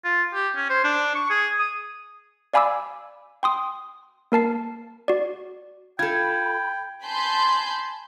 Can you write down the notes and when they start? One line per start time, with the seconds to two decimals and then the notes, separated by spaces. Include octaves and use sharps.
0.04 F4
0.34 G4
0.56 C#4
0.70 C5
0.84 D4
1.15 C#6
1.30 G#4
1.59 D#6
2.53 D5 F5 G#5 B5 D6 E6
3.43 G5 C6 D#6
4.32 A#3 A#4 A5 C7
5.08 F#4 D5
5.99 F4 A4 G5 B5 G#6
7.04 G#5 A5 B5 C6 G6